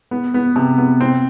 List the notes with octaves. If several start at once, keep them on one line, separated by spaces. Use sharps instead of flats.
B3
B3
C3
B3
C4